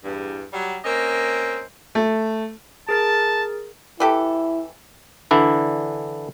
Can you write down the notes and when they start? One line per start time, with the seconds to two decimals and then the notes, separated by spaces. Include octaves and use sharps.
0.04 E2 G2
0.53 F#3 G3
0.84 A#3 C4 C#4 D#5
1.95 A3
2.89 G#4 A#4 A5 A6
4.00 E3 E4 G4 A4
5.31 D3 E3 D4 E4